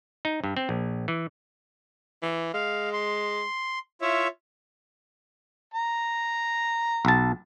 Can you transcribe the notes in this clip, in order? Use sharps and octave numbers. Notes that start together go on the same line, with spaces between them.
D#4
G2
C4
A#1
E3
E3
G#3 F5
C6
E4 F4 C#5 E5
A#5
B1 A5